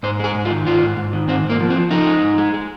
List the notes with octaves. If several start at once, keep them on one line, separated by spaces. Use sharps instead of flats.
G#2 C5
G#3 G#4
G#2
F4
D#3
G#2 F4
G#2
G#2
D#3
G#2 C4
G#2
A#3
F3
C4
F3
F3 D#4
G#3
G#2
G#3
G#3